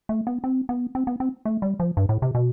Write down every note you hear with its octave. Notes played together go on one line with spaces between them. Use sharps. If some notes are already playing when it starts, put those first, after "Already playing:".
A3
B3
C4
B3
C4
B3
C4
A3
G3
F3
G2
A2
C3
B2